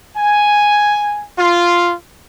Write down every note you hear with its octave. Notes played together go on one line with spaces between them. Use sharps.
G#5
F4